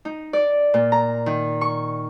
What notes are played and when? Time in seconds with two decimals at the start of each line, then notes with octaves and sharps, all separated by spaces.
0.05 D#4
0.33 D5
0.74 A#2
0.92 A#5
1.26 D#3
1.61 C#6